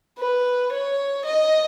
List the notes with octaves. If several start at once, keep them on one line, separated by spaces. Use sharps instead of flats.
B4
C#5
D#5